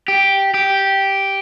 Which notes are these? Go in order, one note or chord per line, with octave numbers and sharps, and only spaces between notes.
G4
G4